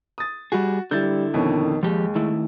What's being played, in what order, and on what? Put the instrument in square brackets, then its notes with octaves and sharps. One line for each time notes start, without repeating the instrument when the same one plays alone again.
[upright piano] D#6 A6
[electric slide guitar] G3 G#4 [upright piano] F#4
[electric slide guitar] D3 E4 [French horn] G3 [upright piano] G6 A6
[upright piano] F2 B2 C#4 [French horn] D#3
[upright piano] D#2 [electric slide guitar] F3 G4 [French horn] G#3
[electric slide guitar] D#3 A3 E4